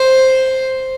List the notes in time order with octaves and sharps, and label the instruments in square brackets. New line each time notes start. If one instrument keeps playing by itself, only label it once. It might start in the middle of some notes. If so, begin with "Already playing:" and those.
Already playing: [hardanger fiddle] C5